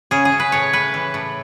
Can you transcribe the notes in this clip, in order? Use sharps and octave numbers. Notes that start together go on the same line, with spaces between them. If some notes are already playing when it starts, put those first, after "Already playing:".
C#3 G#4
G#4
C#3
B4
A2 C#5
A2 B4
E3
A2